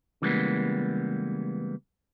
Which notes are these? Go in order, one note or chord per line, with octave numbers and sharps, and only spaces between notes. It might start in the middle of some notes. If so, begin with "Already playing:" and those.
C#3 E3 G3 G#3 A#3 B3